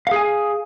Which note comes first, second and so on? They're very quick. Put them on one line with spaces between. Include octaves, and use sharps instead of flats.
F5 G#4 G#5